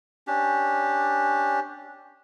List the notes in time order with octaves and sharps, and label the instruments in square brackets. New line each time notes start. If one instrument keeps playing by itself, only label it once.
[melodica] C#4 D4 G4